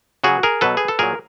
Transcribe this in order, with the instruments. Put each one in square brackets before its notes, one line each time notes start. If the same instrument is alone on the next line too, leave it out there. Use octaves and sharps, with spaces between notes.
[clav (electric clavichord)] C#3 F#3 F#4 G#4
G#4 A#4
B2 F#3 A4 B4
G#4
A4
A#2 F#3 G#4 A#4